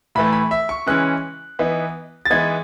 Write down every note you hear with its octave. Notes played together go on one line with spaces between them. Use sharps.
A2 E3 A3 B5
B5
E5
C#6
C#3 E3 G#3 C#4 E4 F#6
E3 B3 D#4
A6
E3 G#3 B3 D#4 G#6